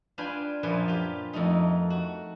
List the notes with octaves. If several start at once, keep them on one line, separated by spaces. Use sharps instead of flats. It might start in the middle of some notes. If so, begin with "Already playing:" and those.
D4 F4 B4 G5 G#5
F#2 A#2 F3 F4 B4 G#5
F4 G4
F2 A3 D#4
F#4